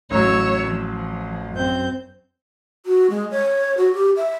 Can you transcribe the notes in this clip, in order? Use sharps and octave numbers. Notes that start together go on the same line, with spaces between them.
A1 F#3 C#5 E6
F3
F#2 C4 G6
F#4
G#3
C#5
F#4
G4
E5